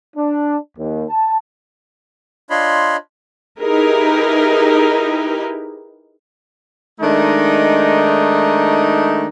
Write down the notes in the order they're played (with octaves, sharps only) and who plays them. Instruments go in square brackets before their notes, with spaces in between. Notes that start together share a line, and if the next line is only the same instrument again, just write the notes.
[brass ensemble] D4
D#2
A5
[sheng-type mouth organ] D4 F4 C#5 D#5 B5 C6
[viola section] D#4 E4 G4 G#4 A#4 B4
[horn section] D#3 G#3 A3 D4 D#4